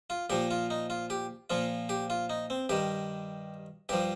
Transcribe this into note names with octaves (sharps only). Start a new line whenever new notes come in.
F4
A#2 F3 G4
F4
D#4
F4
G4
A#2 F3 F4
G4
F4
D#4
C4
G2 D#3 G4
G2 F3 G4